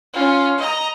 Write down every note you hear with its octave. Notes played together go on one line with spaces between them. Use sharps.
C#4 F4
D#5 A#5